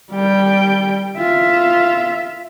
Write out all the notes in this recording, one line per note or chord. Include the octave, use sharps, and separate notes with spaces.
G3 G5
F4 E5